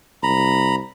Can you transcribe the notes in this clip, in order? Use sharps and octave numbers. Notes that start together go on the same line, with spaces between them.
C2 A#5 B5